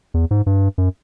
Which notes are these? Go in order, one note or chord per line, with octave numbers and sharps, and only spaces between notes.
E2
G#2
G2
F#2